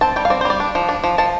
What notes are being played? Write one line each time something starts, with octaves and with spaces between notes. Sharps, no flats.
C4 A5
G3 G5
F5
C4 D5
C5
G3 D5
D4
F3
D4
F3
F3 A5